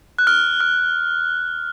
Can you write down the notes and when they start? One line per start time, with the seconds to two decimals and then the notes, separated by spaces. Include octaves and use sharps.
0.19 F#6
0.27 F6
0.60 F6